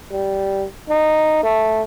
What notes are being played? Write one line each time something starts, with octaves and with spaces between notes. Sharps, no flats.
G3
D#4
A3